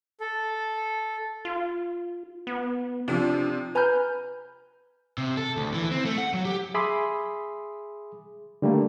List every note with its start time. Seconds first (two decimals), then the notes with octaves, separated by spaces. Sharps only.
0.20 A4
1.45 F4
2.47 B3
3.08 C3 F3 D4
3.75 B4 G#5 A#5 B5 F6 G6
5.18 C3
5.37 A4
5.57 D2
5.73 E3
5.91 C4
6.05 A3
6.18 F#5
6.34 F#3
6.45 G4
6.74 G#4 E5 B5 C6 D6 D#6
8.62 D3 G3 A3 A#3